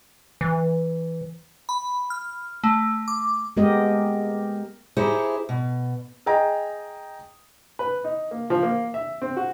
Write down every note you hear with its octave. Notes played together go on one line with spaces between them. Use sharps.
E3
B5
F6
A3
D6
G#3 B3 G4 A#4 D#5
D#4 E4 G4 G#4 C5 C#5
B2
G#4 D#5 G5 A#5
B4
D#4
A#3
F3
A#3
E5
C4
F#4